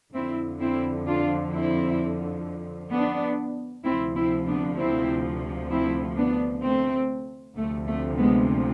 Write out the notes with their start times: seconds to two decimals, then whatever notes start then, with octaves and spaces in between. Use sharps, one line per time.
0.14 F2 D3 F3 C4 E4
0.60 C4 E4
1.07 D4 F4
1.52 C4 E4
2.92 B3 D4
3.85 D2 C3 F3 C4 E4
4.16 C4 E4
4.47 B3 D4
4.78 C4 E4
5.71 C4 E4
6.17 B3 D4
6.63 A3 C4
7.56 D2 C3 F3 A3
7.87 A3
8.18 G#3 B3